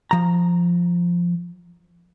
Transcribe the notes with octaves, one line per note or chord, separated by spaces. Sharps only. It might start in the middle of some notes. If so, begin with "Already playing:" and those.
F3 A#5